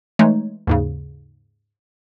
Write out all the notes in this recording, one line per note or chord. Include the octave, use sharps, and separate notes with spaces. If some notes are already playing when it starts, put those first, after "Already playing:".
E3 G#3 A3 D#4 C#5
D#2 G#2 C#3